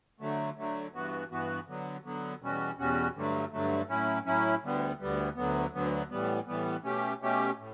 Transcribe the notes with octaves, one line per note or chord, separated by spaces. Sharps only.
D3 F#3 A3
D3 F#3 A3
G2 E3 B3 F#4
G2 E3 B3 F#4
D3 F#3 B3
D3 F#3 B3
E2 B2 G3 C#4 F#4
E2 B2 G3 C#4 F#4
G2 D3 F#3 A3
G2 D3 F#3 A3
A2 F#3 C#4 E4
A2 F#3 C#4 E4
D2 D3 G3 B3
D2 D3 G3 B3
D2 D3 F#3 B3
D2 D3 F#3 B3
A2 E3 G3 B3
A2 E3 G3 B3
B2 A3 C#4 G4
B2 A3 C#4 G4
A2